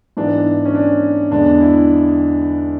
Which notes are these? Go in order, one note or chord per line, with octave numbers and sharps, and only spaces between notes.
G#2 E3 B3 D4
C#4
D4
E2 D3 G#3 D4
E4